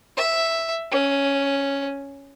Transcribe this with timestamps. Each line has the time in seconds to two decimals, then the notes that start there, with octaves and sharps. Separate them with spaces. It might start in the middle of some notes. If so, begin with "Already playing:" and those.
0.17 E5
0.92 C#4